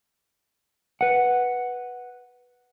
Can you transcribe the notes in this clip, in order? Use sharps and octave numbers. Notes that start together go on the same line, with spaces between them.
B4 F#5